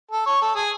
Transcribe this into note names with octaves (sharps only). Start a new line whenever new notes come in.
A4
C#5
A4
G#4